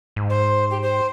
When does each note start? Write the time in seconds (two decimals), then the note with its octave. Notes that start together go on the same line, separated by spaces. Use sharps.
0.16 G#2
0.30 C5
0.70 G4
0.82 C5